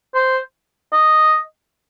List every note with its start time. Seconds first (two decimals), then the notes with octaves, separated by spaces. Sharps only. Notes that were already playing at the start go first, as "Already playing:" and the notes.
0.15 C5
0.93 D#5